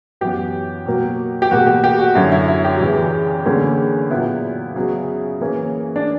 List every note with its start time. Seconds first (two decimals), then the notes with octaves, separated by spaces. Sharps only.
0.21 F#2 E3 B3 G4
0.86 B2 F#3 A#3
1.42 G4
1.51 E2 B2 A#3 F#4
1.67 G4
1.84 G4
1.99 F#4
2.15 F#2 D3 F#3 C#4 E4
2.32 E4
2.48 E4
2.64 G4
2.81 E2 C#3 E3
3.45 E2 D3 A#3 C#4
4.11 A#2 F#3 B3 E4
4.76 C#3 F#3 B3
5.40 C#3 E3 A#3 C#4
5.96 D4